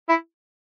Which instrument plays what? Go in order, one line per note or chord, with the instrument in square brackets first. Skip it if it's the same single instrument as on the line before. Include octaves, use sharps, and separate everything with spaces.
[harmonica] E4